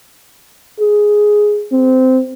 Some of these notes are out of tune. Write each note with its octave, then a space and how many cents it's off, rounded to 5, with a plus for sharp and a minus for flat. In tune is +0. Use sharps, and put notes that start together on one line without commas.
G#4 +5
C4 -15